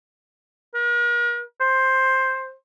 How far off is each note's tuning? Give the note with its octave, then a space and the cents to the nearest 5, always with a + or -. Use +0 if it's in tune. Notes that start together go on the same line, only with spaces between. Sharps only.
A#4 +45
C5 +10